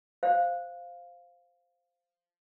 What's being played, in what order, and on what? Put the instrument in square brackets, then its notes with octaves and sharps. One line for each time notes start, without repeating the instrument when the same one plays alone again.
[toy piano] C5 F5